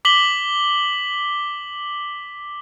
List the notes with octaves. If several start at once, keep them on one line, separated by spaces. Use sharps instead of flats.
D6 B6 F#7 G7